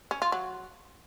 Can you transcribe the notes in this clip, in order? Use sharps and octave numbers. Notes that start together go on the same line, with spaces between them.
C#4
F4
F#3